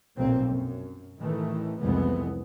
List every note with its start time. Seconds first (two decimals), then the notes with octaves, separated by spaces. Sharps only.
0.17 F1 B1 A#2 A#3 C4
0.47 F#2
1.19 A1 D#3 E3 A3
1.81 F1 C2 F2 E3 G#3 B3